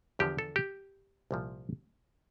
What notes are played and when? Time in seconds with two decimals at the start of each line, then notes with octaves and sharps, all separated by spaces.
0.19 E2 D3 F3 G4
0.39 A4
0.56 G4
1.31 C2 A#2 F3